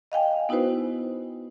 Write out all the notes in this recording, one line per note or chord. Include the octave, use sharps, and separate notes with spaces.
D#5 F5 G5 G#5
B3 D#4 E4 F#4 B4 C5